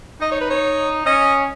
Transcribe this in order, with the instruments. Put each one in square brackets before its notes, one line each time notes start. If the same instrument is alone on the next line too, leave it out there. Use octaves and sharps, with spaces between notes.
[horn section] D#4 [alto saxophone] D#5
[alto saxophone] C#5
B4
C#5
[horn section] C#4 [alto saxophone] D#5